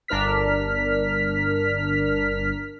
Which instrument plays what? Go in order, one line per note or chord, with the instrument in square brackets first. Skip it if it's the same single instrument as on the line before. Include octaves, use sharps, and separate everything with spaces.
[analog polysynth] G1 D4 A#4 F6 B6